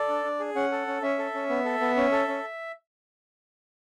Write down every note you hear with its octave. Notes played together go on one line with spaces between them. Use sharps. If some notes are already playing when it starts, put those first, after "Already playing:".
Already playing: A4 D5
D4
D4
G#4
C#4 F#5
A4
C#4
C#4 E5
A4
C#4
B3
A4
B3
C#4
A4
C#4